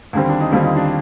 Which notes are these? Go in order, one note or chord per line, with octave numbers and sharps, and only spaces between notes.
D#2 D3 G3 C4
D4
D#4
D#2 D3 G3 C4 F4
D#4
D4